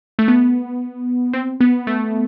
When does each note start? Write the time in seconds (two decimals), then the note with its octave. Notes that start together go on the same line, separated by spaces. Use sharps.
0.19 A3
0.28 B3
1.33 C4
1.61 B3
1.87 A3